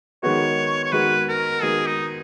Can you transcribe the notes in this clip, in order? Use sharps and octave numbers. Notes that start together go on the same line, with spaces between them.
D#3 G#3 B3 F#4 C#5
C#5
D#3 G#3 B3 F#4 B4
A#4
D#3 G#3 B3 F#4 G#4
D#4